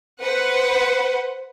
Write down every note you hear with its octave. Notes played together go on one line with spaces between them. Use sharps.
B4 C5 F#5